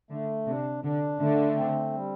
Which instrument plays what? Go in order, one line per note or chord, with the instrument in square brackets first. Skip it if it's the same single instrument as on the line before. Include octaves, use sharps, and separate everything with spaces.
[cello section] D3 [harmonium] A3
[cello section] C3 [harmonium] D4
[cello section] D3 [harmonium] D4
[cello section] D3 [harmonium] A3
[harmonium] C4
G3